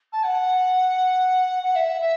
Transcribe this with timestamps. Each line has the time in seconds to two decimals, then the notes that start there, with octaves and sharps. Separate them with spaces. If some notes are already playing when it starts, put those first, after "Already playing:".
0.12 A5
0.24 F#5
1.63 F#5
1.75 E5
2.01 E5